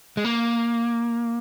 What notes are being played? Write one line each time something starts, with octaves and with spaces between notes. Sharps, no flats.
G#3
A#3